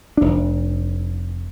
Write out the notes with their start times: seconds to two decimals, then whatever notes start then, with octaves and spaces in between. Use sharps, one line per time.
0.17 F1 D4